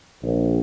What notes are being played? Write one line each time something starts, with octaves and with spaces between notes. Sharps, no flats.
A#1